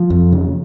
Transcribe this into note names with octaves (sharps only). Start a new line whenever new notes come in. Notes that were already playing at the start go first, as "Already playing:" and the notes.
Already playing: F3
F2
C#3